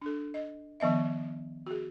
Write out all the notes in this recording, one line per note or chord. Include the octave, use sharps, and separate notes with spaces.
D4 A4
D#5
D#3 F3 B3 D#5 E5
F#4 G#4